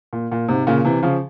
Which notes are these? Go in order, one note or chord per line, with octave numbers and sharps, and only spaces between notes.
A#2
A#2
G#2 C3
A#2 C#3
C3 E3
C#3 F3